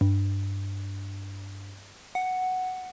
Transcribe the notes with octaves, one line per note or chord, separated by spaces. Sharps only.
G2
F#5